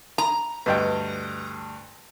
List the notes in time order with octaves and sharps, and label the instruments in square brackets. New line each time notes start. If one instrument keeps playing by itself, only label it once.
[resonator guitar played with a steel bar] A#5
[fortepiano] D2 G2 G5 [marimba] B4 D#5 G6